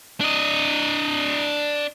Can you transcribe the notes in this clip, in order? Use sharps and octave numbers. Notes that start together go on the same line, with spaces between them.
D4 D#5